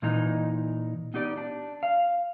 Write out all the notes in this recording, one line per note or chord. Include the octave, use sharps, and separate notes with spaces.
A#2 E3 D#4
B3 D#4 G4 D5
D4
F5